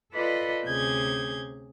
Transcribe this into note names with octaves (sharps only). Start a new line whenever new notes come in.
F4 A4 B4 D5 D#5 B5
D2 C3 C#4 G#4 G6 G#6